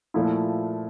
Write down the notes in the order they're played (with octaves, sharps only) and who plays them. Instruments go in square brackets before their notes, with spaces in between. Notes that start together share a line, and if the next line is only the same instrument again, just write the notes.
[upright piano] A#2 F3 A3 E4